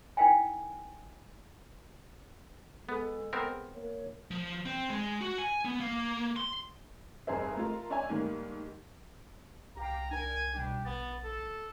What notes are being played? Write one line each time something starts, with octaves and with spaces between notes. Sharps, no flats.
D#4 E4 A#4 F5 G5 G#5
G#3 B3 A4
B3 C4 A#4
A#3 C#5
F3
C4
G#3
F#4
G#5
B3
A#3
C6
F1 G2 G#4 A#4 C5 E5
A3 F4 A#4
D4 C#5 E5 G#5
G#2 D#3 G3 A3 A#3
C2 G4 F5 G5 A#5
D4 A#4 G#5
B2 G3 D4 G4
A#1 B3 A6
A4